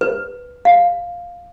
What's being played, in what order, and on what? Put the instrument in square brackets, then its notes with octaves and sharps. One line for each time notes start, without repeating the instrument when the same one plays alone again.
[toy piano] B4
F5